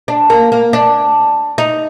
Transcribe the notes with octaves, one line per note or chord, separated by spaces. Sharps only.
D4
A#3
A#3
D4
D#4